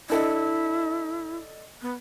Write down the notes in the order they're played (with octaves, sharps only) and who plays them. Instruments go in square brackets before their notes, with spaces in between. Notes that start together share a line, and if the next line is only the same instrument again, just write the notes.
[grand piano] D4 A4 D#5 [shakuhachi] E4
[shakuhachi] B3